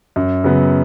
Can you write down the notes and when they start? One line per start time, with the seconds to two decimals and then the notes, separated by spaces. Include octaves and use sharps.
0.16 F#2
0.44 C#3 F#3 B3